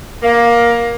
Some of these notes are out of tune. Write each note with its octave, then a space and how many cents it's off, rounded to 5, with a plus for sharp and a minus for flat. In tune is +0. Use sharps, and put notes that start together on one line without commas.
A#3 +15